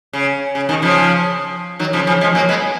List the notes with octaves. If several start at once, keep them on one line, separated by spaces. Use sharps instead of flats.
C#3
C#3
B2 D#3
C#3 F3
D#3 F#3
C#3 F3
C#3 F3
F3 G#3
F#3 A#3
G#3 B3